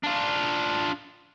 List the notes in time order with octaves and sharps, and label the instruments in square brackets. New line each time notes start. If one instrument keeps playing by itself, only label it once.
[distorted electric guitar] D4 F4